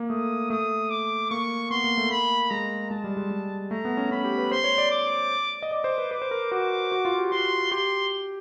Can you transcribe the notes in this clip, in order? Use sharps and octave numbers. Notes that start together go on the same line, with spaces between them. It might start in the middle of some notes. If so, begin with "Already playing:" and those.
Already playing: A#3
A3 D#6
A3 D#6
D6
A#3 C#6
B3 C6
A#3
A3
A#3 B5
G#3 A#5
G#3 A5
G3
G#3
G#3
A3 A#5
B3
C#4
C#4 B5
G4
B4
C5 C6
C#5
D5
D6
D#5
D5 D6
C5
B4
B4 D6
C5
A#4
F#4 D6
F#4
F4
G4
F#4 C6
G4 C6